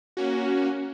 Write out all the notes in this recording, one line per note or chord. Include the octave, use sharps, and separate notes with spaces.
A#3 C#4 F#4